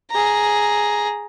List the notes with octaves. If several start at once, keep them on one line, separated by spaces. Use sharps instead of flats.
G#4 A#5